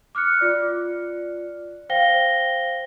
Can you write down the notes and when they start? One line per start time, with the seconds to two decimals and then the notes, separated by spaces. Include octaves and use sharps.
0.15 D6 F6 F#6 C#7
0.41 F4 D5
1.89 C5 F5 G5 A#6 G7